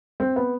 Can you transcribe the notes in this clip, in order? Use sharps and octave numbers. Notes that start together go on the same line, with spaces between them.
C4
B3